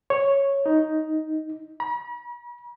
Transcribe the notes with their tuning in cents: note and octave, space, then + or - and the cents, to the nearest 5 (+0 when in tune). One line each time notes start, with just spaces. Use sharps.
C#5 -5
D#4 +5
B5 -45